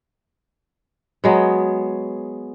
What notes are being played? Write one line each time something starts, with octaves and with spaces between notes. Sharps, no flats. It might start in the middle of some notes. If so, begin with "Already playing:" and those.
F#3 G#3 B3